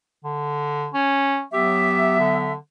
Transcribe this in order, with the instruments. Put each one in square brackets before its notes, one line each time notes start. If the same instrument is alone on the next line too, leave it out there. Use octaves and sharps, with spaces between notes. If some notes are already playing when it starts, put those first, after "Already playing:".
[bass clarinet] D3
C#4
[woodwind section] F#3 B3 E5 [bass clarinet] G4
[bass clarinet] D3